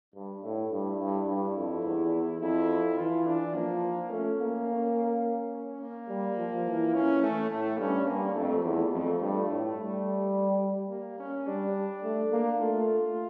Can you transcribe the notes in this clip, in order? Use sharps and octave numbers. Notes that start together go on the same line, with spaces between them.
G2 D4
A2 E4
G2 E4
G2
G2 E4
F2
E2
F2 E4
E3 F4
D4
F3 A#3
A3 C#4
A#3
C#4
A#3
G3
F3
E3
C#4
A3
A2 A3
G2 C#4
G2 A#3
F2 A3
E2 A3
F2
G2
A2
G3
A#3
C#4
G3 D4
A3
A#3
A3 F4